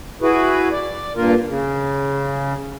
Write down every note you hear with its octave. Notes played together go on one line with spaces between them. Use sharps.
E4 F#4 G#4 B4
D5
G2 A#2 A#3 F4 A#4
C#3